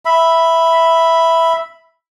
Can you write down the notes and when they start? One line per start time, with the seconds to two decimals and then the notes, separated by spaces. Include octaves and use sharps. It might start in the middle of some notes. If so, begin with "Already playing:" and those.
0.05 E5 B5